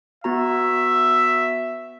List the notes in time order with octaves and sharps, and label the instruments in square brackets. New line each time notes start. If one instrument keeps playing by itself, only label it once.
[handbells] B3 F#4 A#5 [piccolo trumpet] E5